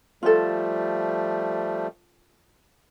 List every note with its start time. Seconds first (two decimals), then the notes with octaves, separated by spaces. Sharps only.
0.23 F3 G3 A3 F4 A4